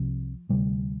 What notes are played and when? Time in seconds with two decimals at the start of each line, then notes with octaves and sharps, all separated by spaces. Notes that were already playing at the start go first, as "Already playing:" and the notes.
Already playing: C2 C3 F3
0.49 D2 C3 G3